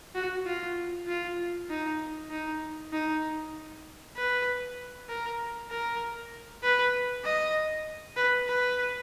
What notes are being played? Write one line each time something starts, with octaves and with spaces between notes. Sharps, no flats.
F#4
F4
F4
D#4
D#4
D#4
B4
A#4
A#4
B4
D#5
B4
B4